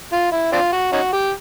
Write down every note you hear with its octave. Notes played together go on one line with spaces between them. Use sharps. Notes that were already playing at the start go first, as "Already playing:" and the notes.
F4
E4
C4 D4 F4
F#4
C#4 D#4 F#4
G4